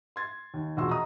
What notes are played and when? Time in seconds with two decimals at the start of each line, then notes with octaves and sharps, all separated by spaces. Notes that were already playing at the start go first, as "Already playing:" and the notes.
0.16 C6 G#6 A6
0.54 D#2
0.77 E1 A#1 F3 F#4 C6 E6
0.91 D#5 A#5 D#6